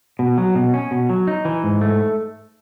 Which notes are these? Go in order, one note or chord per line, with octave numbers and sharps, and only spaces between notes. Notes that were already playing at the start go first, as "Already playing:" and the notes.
B2
F#3
B2
C#4
B2
F#3
D#4
E3
G#2
A3